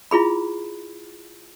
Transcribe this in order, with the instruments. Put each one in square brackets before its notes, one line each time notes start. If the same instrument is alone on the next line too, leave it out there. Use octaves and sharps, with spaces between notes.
[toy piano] E4 F4 G#4 B5